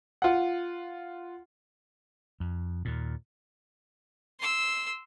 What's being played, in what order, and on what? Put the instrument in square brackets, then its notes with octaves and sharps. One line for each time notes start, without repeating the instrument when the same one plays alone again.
[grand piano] F4 F#5
[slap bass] F2
D#2 A#2
[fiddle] C6 E6